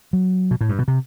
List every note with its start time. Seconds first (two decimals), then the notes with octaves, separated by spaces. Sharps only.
0.13 F#3
0.51 B2
0.61 A2
0.69 G2
0.79 B2
0.88 C3